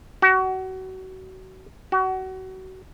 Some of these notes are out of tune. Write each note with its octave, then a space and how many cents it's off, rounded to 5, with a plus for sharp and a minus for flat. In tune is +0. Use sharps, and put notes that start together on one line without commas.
F#4 +30
F#4 +30